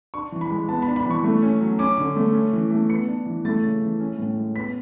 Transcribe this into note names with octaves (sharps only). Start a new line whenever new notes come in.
D4 C#6
E3
B5
G#3
B3 A5
B5
D4
B5
E3 C#6
A3
C#4
F#3
C#4 D6
D3
A3
C#4
E3
A3
B3 C#7
D4
E3
A3 A6
C#3
E3
C#4
A2
G#3
B3 B6